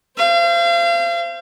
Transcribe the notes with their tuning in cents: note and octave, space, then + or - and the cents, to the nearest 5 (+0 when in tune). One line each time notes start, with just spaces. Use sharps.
C5 +0 F5 -35